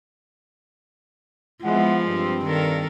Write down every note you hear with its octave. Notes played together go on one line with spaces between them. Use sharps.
F3 G#3 B3 E4 E5 F#5
G2 C4
D#3 A4 A#4